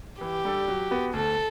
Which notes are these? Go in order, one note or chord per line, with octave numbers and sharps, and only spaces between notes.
E3 G4
G3 D4 A4
F#3
B3 F#4
D2 A4